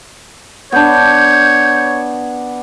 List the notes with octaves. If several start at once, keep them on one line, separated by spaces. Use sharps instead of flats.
B3 D4 C#5 G6